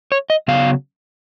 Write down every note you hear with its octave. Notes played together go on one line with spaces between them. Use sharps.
C#5
D#5
C#3 F#3 B3 F5